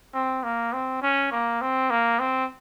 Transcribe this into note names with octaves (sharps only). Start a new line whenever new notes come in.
C4
A#3
C4
C#4
A#3
C4
A#3
C4